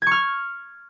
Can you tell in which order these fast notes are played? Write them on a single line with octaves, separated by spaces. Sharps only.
G#6 C#6 F6